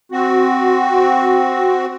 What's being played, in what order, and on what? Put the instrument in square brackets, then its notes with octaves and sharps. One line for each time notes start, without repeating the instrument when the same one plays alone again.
[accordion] C4 F#4